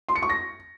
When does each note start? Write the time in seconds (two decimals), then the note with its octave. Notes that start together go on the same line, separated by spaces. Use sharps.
0.09 C6
0.16 C#7
0.23 C#6
0.30 A#6